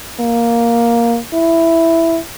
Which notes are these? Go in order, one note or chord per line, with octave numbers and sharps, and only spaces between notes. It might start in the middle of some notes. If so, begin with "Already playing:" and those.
A#3
E4